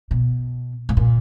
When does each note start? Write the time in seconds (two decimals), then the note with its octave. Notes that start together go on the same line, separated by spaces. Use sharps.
0.11 B2
0.89 A2
0.97 A#2